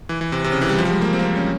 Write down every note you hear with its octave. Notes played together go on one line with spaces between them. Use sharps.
E3
E3
C3
C3
C#3
E3
G3
F3
G3
G#3
A#3
C4
A#3
C4
C#4